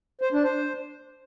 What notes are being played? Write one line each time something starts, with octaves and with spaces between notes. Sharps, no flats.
C5
D4
C5